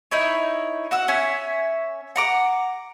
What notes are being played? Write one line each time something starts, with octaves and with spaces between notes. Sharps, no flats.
D#4 E4 C#5
F#4 F#5 E6
C#4 C#5 E5 G#5
F#5 A#5 D6